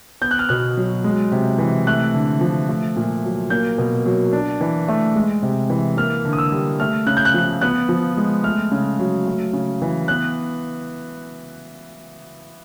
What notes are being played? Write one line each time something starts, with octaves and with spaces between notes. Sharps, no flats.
B3 G6
F#6
F6
B2 F#6
F#3
G#3
C3
E3
A3 F#6
D3
F3
A3
A#2
F#3
A#3 G6
B2
F#3
D4
E3
A3
G#3
C3
E3
A#3 F6
D3
D#6
E6
G3
A3 F6
C#3 F#6
G6
F#6
F3
B3 F#6
F3
G#3
A3 F6
C#3
F#3
A3
C#3
E3
B3 F#6